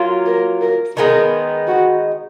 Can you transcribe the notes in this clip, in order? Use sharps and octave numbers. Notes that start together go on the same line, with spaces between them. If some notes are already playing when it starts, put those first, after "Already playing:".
Already playing: F#3 A#3 F4
A#4
A#4
D#3 G#3 B3 D#4 A#4
F#4